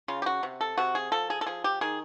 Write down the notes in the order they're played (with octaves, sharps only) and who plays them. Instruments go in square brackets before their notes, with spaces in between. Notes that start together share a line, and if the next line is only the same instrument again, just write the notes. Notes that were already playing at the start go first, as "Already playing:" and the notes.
[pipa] C#3 F4
G4
F#4
C3
A4
C3 F#4
G#4
F3 A4
G#4
A4
F3 G#4
G4
D#3 G#4